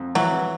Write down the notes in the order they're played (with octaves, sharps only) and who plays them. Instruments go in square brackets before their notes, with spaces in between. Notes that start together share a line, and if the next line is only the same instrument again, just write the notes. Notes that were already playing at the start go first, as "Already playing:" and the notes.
Already playing: [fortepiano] F2
[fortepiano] E3 [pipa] F#3